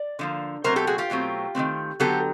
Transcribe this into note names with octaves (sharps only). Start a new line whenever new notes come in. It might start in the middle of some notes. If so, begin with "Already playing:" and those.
Already playing: D5
D3 F3 A#3
B2 F#3 A3 C4 A#4 C5
G4 A4
F#4 G#4
F4 G4
B2 F#3 A3 C4
D#3 F#3 A3 C4
D3 F#3 B3 G4 A4